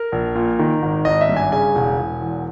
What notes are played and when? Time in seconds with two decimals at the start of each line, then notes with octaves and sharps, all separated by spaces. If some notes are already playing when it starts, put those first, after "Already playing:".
Already playing: A#4
0.12 A#1
0.35 A#2
0.59 D#3
0.82 G#1
1.05 G#1 D#5
1.21 E5
1.29 G2
1.37 G#5
1.52 C#3 G#5
1.75 E1
1.99 E1
2.22 E2